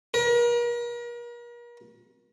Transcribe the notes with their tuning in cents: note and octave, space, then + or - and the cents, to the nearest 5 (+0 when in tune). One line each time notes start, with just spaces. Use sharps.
A#4 +40